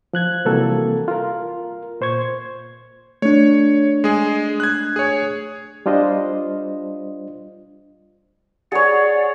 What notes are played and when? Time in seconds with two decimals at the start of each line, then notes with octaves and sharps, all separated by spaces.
0.13 F3 F#6 G#6
0.45 C3 E3 G3 A#3 F#4 A4
1.08 F4 A#4
2.01 A#2 C5 C#6 G#6
3.22 A3 D4 C#5
4.04 G#3 G#4
4.60 F#6 G#6
4.96 G#4 C#5
5.86 G3 D4 F4 C5 D#5
8.72 G#4 C#5 D5 F#5